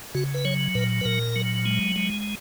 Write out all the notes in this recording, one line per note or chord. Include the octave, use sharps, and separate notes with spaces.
C#3 F#4
B4
F#3 C#5
A#2 B4
B4
A#2 A#4
F#3
G#3
G#3